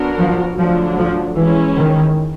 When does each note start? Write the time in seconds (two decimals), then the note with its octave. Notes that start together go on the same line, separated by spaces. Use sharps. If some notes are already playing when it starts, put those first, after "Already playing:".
Already playing: F#3 B3 D4 F#4 A#4
0.19 F3
0.58 D3 F3 F#3 A3 D4
0.97 F3
1.36 E3 G#3 C#4 E4
1.75 D#3